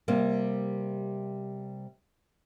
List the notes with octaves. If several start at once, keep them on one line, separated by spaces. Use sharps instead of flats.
C3 G3 A#3